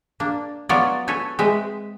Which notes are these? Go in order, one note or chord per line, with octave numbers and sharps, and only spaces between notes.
A#3 D4
F#3 B3 F4 C#5 D5
A4 B4 C#5 G#5
G#3 C4 B4 E5